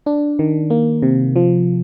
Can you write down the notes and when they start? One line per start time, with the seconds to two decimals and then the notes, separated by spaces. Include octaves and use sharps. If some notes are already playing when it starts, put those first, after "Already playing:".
0.06 D4
0.39 D#3
0.70 A#3
1.02 C3
1.36 F3